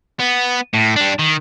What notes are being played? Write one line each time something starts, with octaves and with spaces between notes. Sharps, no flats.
B3
A2
G3 D4
D#3